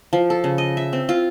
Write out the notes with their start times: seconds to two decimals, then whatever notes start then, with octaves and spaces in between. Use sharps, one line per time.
0.13 F3
0.30 A4
0.44 C#3
0.58 D#5
0.77 E5
0.93 C4
1.09 F4